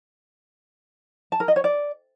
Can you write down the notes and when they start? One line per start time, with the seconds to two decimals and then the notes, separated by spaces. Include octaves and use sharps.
1.32 A5
1.40 A#4
1.48 D#5
1.56 C#5
1.64 D5